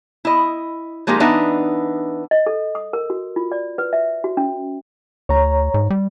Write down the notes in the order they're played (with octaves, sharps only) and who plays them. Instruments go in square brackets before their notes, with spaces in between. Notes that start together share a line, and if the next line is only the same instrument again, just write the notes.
[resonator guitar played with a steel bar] E4 D#5
F3 G#3 A#3 D#4 G4
E3 B3 D4 D#4 E5
[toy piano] D#5
A4
D#6
A#4
F#4
F4
D5
B4
E5
F#4
C#4
[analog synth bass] D2 [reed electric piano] C#5 A#5
[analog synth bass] G#2
G3